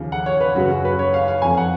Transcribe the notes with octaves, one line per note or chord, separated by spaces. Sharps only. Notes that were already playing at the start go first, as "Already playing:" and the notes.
Already playing: D#2 C#3 F3
F#5
C#5
B4
F#2 C#3 F#3 F#4
F#4
B4
C#5
F5
F5
F2 F3 G#5
F#5